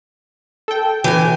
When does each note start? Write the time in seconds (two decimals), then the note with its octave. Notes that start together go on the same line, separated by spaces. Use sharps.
0.68 A4 G5
1.04 E3 G5 G#5